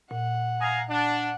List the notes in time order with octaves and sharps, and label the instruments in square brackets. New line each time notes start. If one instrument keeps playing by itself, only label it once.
[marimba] A#2 [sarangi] F#5
[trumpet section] F5 G#5 A#5 [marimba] D#6
[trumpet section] D4 [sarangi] F#5